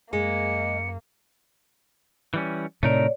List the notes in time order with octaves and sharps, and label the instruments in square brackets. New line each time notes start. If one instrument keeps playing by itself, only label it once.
[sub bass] F#2 [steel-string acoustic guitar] G#3 [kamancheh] A#3 [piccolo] C#7
[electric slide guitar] E3 G3 C#4
[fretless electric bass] A2 C3 [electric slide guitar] A3 D#4 A#4 [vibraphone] C#5 D5